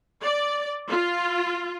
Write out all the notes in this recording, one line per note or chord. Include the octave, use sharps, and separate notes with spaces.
D5
F4